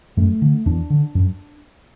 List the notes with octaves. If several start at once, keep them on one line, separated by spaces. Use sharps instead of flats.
F#2 A3
D3
E2 D4
D3
F#2